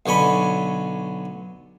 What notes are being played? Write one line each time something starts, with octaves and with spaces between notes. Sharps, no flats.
B1 D3 C#5 G#5 B5